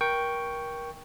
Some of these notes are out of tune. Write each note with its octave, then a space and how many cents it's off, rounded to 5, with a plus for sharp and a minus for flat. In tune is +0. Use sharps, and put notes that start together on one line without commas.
A#4 +25 G5 +0 C#6 +0